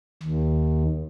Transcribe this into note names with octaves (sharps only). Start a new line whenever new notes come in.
D#2